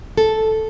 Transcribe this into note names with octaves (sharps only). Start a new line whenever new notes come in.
A4